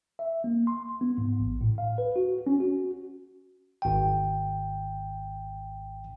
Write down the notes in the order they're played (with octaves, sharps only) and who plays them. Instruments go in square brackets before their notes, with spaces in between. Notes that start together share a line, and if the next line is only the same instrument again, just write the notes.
[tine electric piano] E5
A#3
C6
B3
G#2
A1
A2
F5
B4
F#4
C#4
F#4
G#1 G5